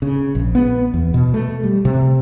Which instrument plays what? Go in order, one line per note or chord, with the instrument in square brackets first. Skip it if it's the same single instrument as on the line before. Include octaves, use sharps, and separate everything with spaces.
[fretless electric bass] C#3
A#1
B3
E2
B2
A3
G3
C3